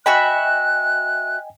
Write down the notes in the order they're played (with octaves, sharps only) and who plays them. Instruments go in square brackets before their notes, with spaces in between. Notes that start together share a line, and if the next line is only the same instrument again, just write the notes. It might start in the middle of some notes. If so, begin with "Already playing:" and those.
[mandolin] F#4 E5 B5 [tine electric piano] D#5 G5 G#5 [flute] F#6